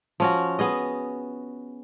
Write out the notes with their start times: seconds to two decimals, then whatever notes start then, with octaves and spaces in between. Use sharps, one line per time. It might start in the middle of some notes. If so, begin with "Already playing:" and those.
0.20 F3 C#4 F#4
0.59 B3 G#4 D#5